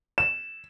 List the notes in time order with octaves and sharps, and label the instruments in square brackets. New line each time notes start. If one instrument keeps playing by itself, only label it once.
[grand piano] E7